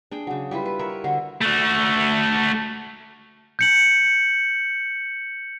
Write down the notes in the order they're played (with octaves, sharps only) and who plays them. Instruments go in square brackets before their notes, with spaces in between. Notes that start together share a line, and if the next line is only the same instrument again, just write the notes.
[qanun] D4 G#4 G5
C#3 F#3
G3 E4 F4 B4
B4
A#4 C#5 D5 E5
D3 D4 F#4 C5
[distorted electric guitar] A3 F#4
[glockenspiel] G6 C#7 F#7